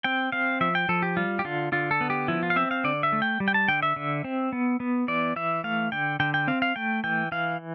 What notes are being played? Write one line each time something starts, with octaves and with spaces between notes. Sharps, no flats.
C4 G5
C4 F5
F3 E5
G5
F3 A4
G4
G3 F4
G4
D3 F4
D3 F4
A4
B3
G4
F3 E4
F4
F5
C4 E5
F5
D3 D5
E5
A3
G5
G3
G5
A5
D3 G5
E5
D3
C4
B3
B3
E3 D5
E3 E5
A3 F5
D3 G5
D3 G5
G5
C4 F5
F5
A3 G5
E3 G5
E3 F5